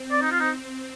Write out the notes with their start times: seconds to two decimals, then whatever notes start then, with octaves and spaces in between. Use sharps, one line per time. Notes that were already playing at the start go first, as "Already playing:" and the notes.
Already playing: C4
0.12 D5
0.22 D#4
0.31 F4
0.40 D#4